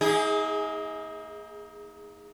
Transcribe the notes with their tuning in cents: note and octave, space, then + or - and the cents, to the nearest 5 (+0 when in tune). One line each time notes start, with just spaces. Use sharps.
A#3 +0 D#4 +40 G#4 -15